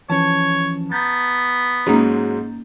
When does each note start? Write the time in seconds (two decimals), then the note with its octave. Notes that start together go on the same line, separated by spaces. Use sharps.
0.10 E3 F3 C#4 C#5 A5
0.92 B3 A#5 G6 A6
1.86 G#2 F#3 G#3 A#3 C#4 D#4